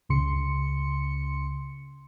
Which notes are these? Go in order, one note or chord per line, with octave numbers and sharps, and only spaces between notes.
C#2 C#3 C6 C#7